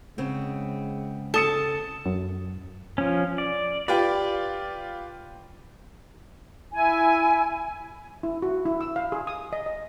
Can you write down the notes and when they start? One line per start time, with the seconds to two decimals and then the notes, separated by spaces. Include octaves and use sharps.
0.18 C#3 G#3 B3 C4
1.34 A4 A5 D#6 C#7
2.06 F#2
2.98 F3 C#4
3.38 D5
3.88 F4 G4 B4 D5
6.72 E4 G#5
8.23 E4
8.42 F#4
8.65 E4
8.81 E6
8.96 F5
9.12 G#4
9.27 D#6
9.53 D#5
9.66 D#5